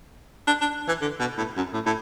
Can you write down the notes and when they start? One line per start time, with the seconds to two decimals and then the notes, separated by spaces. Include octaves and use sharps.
0.47 D4
0.61 D4
0.88 E3
1.01 D3
1.20 B2
1.38 A2
1.57 F#2
1.73 A2
1.86 A2